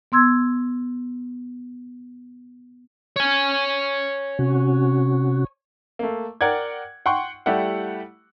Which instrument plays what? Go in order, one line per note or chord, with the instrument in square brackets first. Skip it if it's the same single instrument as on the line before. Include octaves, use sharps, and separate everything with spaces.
[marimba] B3 C6 E6 G#6
[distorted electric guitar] C#5 G#5
[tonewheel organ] C3 C#4 F#4
[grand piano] A3 A#3
A#4 D5 F#5 G5 G#6
F#5 G5 C6 C#6
G3 A3 E4 G4 F#5